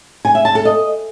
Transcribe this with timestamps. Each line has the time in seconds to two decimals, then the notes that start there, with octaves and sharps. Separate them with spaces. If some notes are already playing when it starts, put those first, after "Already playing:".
0.25 G#5
0.35 E5
0.45 A5
0.55 A4
0.65 D#5